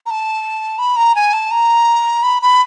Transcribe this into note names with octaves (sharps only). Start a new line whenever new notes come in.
A#5
A5
B5
A#5
G#5
A5
A#5
B5
B5